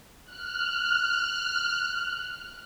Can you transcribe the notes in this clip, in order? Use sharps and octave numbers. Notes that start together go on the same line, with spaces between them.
F6 F#6